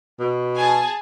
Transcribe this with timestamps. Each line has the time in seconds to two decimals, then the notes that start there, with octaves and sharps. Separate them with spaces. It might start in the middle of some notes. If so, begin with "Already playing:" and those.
0.20 B2
0.56 G#4 G#5 A5